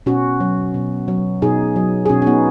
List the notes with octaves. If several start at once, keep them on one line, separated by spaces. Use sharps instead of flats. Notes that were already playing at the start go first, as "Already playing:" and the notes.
B2 C#4 F#4
F#3
B2
F#3
B2 D#4 G#4
F#3
G#4
B2 C#4 F#4
C#4
B3 D#4